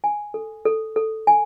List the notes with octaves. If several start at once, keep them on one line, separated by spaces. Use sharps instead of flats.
G#5
A4
A4
A4
G#5